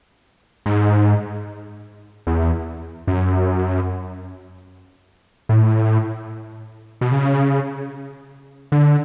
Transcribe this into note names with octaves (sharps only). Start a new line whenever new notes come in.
G#2
E2
F#2
A2
B2
C#3
D3